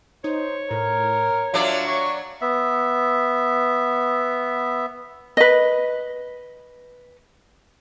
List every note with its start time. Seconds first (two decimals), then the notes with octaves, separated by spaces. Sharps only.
0.24 D#4 C5 C#5
0.71 A2 A#4
1.54 F#3 D4 F4 D5 E5
1.88 C#6
2.41 B3 E5
5.37 B4 D#5